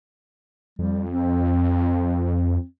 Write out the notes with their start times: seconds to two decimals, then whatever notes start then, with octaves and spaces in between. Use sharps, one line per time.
0.79 F2 G3
1.11 C4